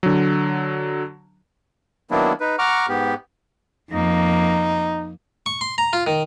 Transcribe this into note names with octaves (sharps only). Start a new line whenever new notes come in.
D3 F#3
D#3 F#3 A#3 B3 D4 E4
D#4 B4
F#5 A#5 C#6 D6 F6
G#2 B3 G4
F2 A#3 D#4
C#6
C6
A#5
F4
D#3